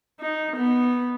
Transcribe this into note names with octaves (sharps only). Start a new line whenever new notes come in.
D#4
B3